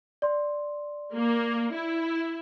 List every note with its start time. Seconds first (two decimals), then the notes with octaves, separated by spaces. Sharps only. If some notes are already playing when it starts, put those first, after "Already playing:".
0.22 D5 C6
1.14 A#3
1.74 E4